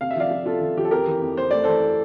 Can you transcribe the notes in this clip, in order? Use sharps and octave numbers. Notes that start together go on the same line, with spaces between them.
C3 F5
E5
F3 D5 F5
F3
C3 F4 A4
F3
F3 G4
A4
F2 G4 A#4
E3
F2
F2 C5
A3 D5
E3 A4 C5